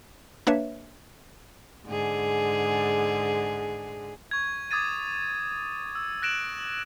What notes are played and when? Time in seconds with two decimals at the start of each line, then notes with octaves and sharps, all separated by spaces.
0.47 A#3 D4 B4 C#5 E5
1.86 G#2 D3 G#4
4.31 C#6 G#6
4.71 D6 D#6 G#6 A6 D#7
5.95 E6
6.22 F#6 A#6 D7 E7 F#7